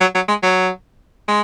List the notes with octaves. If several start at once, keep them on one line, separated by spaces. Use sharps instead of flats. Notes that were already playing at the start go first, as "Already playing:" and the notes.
F#3
F#3
G#3
F#3
G#3